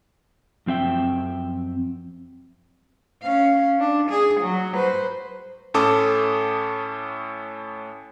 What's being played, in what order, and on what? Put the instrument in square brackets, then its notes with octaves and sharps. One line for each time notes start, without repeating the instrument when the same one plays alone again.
[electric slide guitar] F#2 F3 C4 E5 G5
[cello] C#4 F5
D4
G#4
F#3
B4 C5
[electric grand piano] A2 C#4 A4 A5 D6 D#6